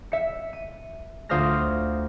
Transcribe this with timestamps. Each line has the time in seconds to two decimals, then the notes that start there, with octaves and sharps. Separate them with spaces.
0.12 E5 C#7
0.53 D#7
1.29 D2 F4 C5 D#6 F6 A#6